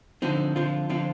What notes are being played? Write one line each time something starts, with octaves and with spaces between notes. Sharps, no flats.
D3 F3 C4 D#4
D3 F3 C4 F4
D3 F3 C4 F4